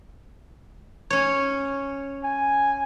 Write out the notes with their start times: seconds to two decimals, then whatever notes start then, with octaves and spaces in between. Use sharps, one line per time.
1.10 C#4 C#5
2.24 G#5